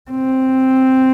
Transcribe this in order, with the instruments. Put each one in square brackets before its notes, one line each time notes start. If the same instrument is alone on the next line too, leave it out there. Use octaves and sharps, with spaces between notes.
[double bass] C4